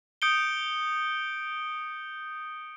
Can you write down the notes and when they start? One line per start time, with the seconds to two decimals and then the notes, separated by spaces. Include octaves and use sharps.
0.22 D#6 G6 C#7 D7 G7